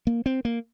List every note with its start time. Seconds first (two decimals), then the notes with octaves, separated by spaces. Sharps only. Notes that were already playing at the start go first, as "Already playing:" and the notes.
0.07 A#3
0.26 C4
0.45 A#3